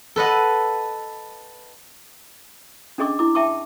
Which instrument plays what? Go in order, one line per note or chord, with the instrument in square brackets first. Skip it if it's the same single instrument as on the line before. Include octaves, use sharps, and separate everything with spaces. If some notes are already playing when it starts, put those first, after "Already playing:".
[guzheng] A4 B4 D#5 F#5
[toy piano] C#4 D4 G#4 D#5 C#6 D6
E4 D6
E5 G5 A5 C#6 D6